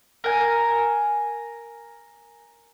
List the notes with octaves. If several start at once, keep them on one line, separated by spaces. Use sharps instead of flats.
A#4 G#5